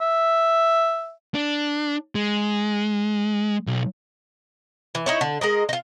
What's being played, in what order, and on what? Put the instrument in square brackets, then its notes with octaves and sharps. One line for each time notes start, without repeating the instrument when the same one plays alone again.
[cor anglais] E5
[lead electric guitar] D4
G#3
B1
[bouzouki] E3
D#4 E4 C#5
D3
G#3 A#4 D#5
D#4 F4